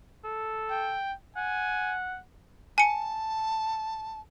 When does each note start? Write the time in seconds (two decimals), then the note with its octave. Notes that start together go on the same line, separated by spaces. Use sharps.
0.24 A4
0.71 G5
1.37 F#5 G#5
2.78 G#5 A5 C#7